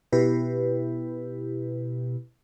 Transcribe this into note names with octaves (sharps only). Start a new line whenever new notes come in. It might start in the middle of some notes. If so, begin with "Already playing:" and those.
B2 E4 G4 B4